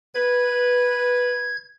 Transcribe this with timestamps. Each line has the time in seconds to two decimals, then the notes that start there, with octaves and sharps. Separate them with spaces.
0.15 B4 G#6